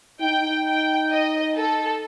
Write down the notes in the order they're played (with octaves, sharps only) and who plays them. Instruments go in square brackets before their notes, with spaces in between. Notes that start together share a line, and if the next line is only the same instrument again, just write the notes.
[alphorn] D#4 [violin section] G5
[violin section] G5
D#5
A4